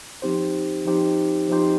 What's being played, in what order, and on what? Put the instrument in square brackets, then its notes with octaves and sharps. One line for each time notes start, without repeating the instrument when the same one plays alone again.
[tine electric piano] F3 C4 D#4 G4 C5
F3 C4 D#4 G4 C5
F3 C4 D#4 G4 C5